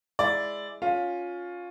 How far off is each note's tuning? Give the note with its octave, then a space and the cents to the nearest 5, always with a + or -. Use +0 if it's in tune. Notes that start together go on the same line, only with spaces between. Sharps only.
G#3 +0 E4 +0 D5 +0
C#4 +10 F4 +15